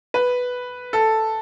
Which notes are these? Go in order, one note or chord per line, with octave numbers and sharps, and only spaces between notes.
B4
A4